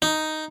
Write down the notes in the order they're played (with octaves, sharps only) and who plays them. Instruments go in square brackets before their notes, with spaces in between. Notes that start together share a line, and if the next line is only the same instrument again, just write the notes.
[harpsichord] D#4